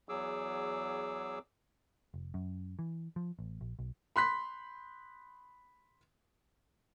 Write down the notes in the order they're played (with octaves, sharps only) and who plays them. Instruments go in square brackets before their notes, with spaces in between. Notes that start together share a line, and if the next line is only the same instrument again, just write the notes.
[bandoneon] E2 F#3 G#4 D6 E6
[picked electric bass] F1
F#2
E3
F3
A1
A#1
B1
[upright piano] B5 C6 F#6 B6